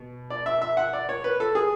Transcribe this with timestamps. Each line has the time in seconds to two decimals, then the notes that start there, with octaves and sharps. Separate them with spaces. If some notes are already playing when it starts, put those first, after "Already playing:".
Already playing: B2
0.30 D5
0.46 E5
0.62 E5
0.77 F#5
0.93 D5
1.09 C#5
1.24 B4
1.40 A4
1.55 G#4